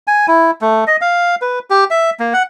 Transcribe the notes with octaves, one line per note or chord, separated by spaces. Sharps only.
G#5
E4
A3
D#5
F5
B4
G4
E5
A#3
F#5